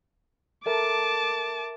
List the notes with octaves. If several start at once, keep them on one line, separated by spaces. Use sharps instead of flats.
A4 A#4 E5 A5 D6